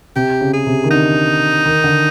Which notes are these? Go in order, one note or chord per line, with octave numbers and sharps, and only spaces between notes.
C3 G4
C#3
G#4
C3
D#3
D3 D#4
D#3
D3